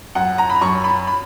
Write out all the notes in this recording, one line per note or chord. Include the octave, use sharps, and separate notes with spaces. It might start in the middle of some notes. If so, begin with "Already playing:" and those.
F#2 F#5
A#5
B5
F#2 C#6
B5
B5